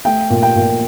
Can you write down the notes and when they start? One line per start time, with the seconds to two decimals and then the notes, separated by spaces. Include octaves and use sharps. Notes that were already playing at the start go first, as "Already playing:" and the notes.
0.05 A3 G5
0.30 A#2
0.42 G5
0.56 A#2